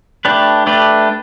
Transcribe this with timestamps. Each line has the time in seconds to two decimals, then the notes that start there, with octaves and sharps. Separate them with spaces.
0.25 A3 D4 G4 B4
0.67 A3 D4 G4 B4